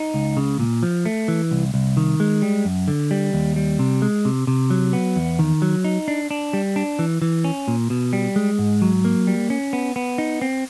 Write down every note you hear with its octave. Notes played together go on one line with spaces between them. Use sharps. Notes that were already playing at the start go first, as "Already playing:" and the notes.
Already playing: D#4
C#2
C#3
A#2
F3
A3
E3
C2
C2
D#3
G#3
G3
F#2
D3
G3
D#2
G3
C3
G#3
C3
C3
F#3
B3
E2
D#3
F#3
D#4
D4
D4
G3
D4
E3
E3
C#4
A#2
B2
G3
G#3
G#2
F#3
A#3
G3
C#4
B3
B3
D#4
C4